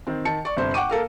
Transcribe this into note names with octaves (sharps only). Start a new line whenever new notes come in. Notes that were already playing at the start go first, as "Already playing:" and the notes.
D#3 C4
D#3 A5 C#7
D5 C#6
G1 C3 C5
F#5 G5 C#6 D6 D#7
A#3 A4 A#4 F5